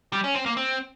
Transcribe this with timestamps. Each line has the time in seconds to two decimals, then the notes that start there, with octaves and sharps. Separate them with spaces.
0.13 G3
0.24 C#4
0.35 C4
0.46 A#3
0.57 C4